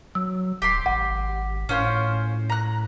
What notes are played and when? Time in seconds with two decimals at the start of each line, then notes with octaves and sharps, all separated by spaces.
0.15 F#3 E6
0.62 D1 G4 C6
0.86 G#1 F#5
1.69 A2 C#4 F4 C5
2.50 A#5 F#6